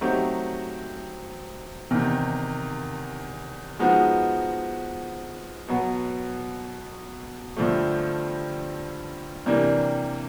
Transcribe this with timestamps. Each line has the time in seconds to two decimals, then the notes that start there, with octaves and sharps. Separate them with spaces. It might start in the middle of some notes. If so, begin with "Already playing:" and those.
0.01 F#3 A3 C4 D#4 G4
1.91 E2 C3 D#3
3.79 F3 G#3 B3 D#4 F#4
5.68 B2 F#3 B3
7.57 G2 D3 F3 A3
9.46 C3 E3 G3 A#3 D4